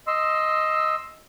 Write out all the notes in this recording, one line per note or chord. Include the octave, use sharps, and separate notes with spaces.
D#5 C6 E6